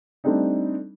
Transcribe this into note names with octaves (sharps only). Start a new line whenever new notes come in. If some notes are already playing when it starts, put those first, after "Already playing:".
G3 A3 C4 D4 D#4